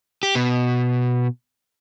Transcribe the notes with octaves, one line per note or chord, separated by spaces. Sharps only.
G4
B2